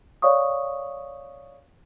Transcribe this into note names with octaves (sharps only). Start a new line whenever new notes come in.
C#5 D5 F5 C#6 D#6